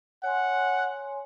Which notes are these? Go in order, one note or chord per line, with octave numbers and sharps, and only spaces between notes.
C#5 F#5 G#5 C6